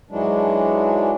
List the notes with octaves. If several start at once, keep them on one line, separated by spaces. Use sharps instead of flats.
G#2 E3 F#3 G#3 D4